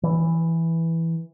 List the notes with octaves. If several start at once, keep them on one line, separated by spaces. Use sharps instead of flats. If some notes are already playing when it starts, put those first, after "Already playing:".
E3